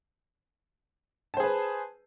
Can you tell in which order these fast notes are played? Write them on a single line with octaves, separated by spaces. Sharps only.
A5 C5 G#4 B4